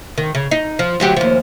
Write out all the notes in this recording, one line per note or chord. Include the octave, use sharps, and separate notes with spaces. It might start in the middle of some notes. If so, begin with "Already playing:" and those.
D#3
C#3
D#4
F3
D2 F#3 G4
D#2 F3